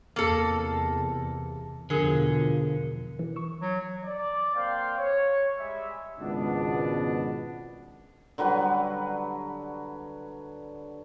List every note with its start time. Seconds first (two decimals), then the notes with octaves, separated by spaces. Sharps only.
0.16 E2 C3 A#3 A4
1.90 E2 B2 D3 F3 G#4 A#4
3.19 E3
3.36 C#6 E6
3.62 F#3
4.05 D5
4.55 A#3 C4 F5 G5 C6
4.98 C#5
5.58 G3 G#3 E5
6.19 G#1 C#2 B2 B3 D4
8.38 D3 F#3 G3 B4